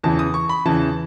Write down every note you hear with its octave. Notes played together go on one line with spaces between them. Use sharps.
E2 C#3 E3 A5
D#6
C#6
B5
E2 C#3 E3 A5